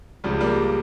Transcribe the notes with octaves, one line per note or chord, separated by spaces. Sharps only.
C#2 C#3 F3 G3
G3 A#3